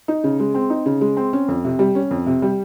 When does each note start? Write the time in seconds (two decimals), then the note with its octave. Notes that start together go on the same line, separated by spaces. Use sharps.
0.08 D#4
0.24 C#3
0.40 G#3
0.55 C4
0.70 D#4
0.86 C#3
1.01 G#3
1.17 C4
1.33 C#4
1.48 F2
1.65 C3
1.79 G3
1.95 C#4
2.11 F2
2.26 C3
2.42 G3